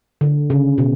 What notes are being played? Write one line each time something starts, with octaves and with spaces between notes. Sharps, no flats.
D3
C#3
B2